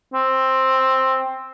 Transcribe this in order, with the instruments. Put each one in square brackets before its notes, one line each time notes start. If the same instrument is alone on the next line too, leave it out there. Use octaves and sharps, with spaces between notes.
[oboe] C4